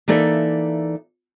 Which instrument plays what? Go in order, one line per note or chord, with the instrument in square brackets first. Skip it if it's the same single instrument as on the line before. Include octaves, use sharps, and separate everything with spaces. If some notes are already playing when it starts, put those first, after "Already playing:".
[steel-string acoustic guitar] E3 A#3 D#4 A4 D5 E5